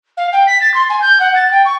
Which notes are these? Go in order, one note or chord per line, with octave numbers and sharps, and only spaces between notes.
F5
G5
B6
A6
C6
G#5
G6
F#5
A6
G5
C#6